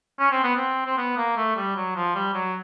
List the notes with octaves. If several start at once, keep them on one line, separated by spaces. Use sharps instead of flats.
C#4
C4
B3
C4
C4
B3
A#3
A3
G3
F#3
F3
G3
F#3